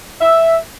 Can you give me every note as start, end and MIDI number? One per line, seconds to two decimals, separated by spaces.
0.21 0.56 76